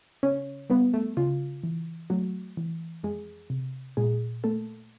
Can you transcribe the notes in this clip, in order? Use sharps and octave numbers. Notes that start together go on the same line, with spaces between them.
C#3 C#4 C#5
G3 B3 B4
A3 A4
C#3 F4
E3
F#3 A3 F#4
E3
F2 G#3 G#4
C3
A#2 G#3 G#4
A3 A#3 A4